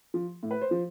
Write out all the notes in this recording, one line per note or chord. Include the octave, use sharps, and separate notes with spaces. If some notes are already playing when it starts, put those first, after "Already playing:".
F3
A2
B4
C5
F3